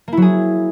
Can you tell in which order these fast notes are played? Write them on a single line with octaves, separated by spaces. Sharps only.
A#3 E4 F#3 G#4